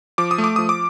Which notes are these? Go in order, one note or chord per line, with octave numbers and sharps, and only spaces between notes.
F3 D6
D#6
A3
D6
F3 D#6
D6